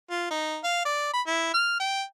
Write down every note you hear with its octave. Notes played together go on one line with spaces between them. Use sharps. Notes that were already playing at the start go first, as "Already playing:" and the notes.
F4
D#4
F5
D5
B5
E4
F6
G5